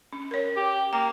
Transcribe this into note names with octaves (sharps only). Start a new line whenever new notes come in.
C#4
A#4 C#5
G4
A#3 G5